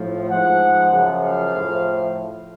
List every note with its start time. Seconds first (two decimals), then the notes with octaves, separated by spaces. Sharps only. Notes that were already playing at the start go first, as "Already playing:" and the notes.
Already playing: A2 F3
0.29 G#2 F3 F#5
0.91 F#2 C#3 F3
1.23 F5
1.54 A2 F3